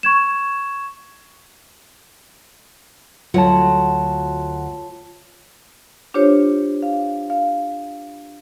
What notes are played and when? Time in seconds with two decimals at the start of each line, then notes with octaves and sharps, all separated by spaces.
0.03 C#6 G#6 E7
3.34 D2 F#3 F4 C#5 F#5 A5
6.14 D4 F4 G4 C5 C#5
6.82 F5
7.30 F5